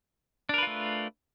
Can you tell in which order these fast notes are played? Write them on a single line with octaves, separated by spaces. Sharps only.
D4 A#4 B4 F4 A3